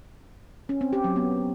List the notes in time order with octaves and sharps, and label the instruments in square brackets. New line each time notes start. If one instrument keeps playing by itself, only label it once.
[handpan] C#4
C4
G4
F#3
B3